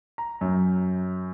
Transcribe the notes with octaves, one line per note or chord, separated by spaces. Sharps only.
A#5
F#2